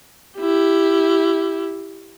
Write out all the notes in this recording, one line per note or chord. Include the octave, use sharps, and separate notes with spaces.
E4 G4